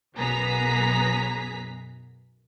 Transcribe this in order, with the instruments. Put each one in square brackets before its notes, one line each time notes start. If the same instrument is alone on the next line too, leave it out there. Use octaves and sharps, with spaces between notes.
[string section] B1 F#2 B3 G#4 A#5 B6